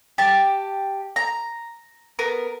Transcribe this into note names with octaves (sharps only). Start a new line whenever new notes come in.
G4 A5
A#5
B3 A#4